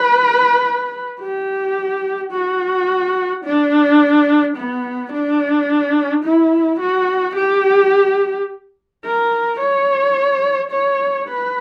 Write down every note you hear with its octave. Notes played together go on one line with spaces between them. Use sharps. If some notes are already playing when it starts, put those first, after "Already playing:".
Already playing: B4
G4
F#4
D4
B3
D4
E4
F#4
G4
A#4
C#5
C#5
B4